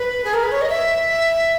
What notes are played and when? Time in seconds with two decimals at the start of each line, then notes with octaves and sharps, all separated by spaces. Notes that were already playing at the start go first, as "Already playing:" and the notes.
Already playing: B4
0.24 G#4
0.34 A#4
0.43 B4
0.52 C#5
0.61 D#5
0.69 E5